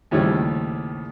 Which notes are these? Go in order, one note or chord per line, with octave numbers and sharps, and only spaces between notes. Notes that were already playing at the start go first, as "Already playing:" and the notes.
D#2 A2 C#3 F3 G3